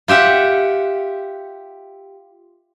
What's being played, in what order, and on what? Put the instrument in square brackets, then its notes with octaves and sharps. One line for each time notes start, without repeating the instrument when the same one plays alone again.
[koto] F4 G4 E5 F#5